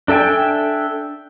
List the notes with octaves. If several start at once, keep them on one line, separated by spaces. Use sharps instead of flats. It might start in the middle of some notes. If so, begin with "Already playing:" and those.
D4 A4 E5 G5 G#5